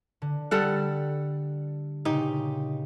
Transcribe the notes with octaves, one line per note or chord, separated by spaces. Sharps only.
D3
G3 A4 F#5
A#2 C#3 D#4 G4